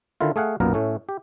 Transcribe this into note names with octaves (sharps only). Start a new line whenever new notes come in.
D3 D#3 E4 F4
A3 G#4 F5 F#5
B1 F#2 A#2 A#3 B3 A#4
A2 A3 C#4
G4